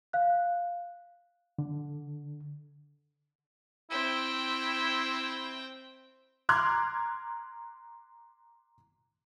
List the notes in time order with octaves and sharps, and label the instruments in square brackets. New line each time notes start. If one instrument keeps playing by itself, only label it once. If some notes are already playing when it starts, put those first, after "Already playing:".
[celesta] F5 F#6
[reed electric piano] D3
[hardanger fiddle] C4 G5 [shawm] E4
[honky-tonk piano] A#5 C6 D6 F6 F#6 G#6